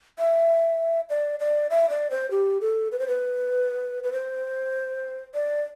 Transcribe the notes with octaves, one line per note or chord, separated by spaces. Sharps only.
E5
D5
D5
E5
D5
C5
G4
A4
B4
C5
B4
B4
C5
D5